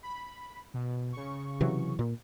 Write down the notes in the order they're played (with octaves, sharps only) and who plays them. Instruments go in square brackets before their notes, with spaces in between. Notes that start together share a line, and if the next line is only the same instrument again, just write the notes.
[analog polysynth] B5
B2
C#3 C#6
[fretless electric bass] C3 E3 F#3
A#2